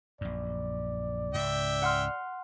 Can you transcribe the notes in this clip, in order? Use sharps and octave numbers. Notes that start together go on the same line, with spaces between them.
A#1 F#2 D5
C#2 G#2 C#3 E5 G5
F#5 C6 F6